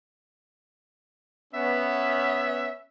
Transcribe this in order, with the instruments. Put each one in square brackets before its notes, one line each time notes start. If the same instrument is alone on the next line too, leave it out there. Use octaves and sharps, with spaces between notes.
[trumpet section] B3 C#4 [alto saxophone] E5